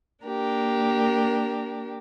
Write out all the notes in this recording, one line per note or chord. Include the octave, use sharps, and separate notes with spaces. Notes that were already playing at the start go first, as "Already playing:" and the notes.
A#3 D4 G4 A#4